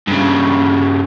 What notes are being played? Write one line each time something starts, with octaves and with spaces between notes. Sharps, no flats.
G2 C#3